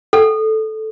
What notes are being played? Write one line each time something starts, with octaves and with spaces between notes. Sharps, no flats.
A4